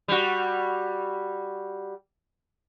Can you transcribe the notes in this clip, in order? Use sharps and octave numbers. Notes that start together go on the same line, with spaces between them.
G3 F#4